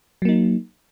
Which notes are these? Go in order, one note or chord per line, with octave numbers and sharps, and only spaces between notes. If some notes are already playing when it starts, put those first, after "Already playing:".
F#3 A#3 D#4